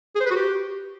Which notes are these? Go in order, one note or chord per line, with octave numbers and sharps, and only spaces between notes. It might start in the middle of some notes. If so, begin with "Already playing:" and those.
G#4
C5
B4
F#4
G4